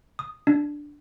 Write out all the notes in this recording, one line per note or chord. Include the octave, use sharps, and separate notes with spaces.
D#6
D4